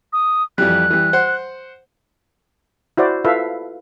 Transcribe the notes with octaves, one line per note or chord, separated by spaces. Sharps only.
D#6
F2 E3 G3 F#6
E3 G3
C5 F#5
E4 F#4 C5 D5
E4 F4 A4 B4 E5 F5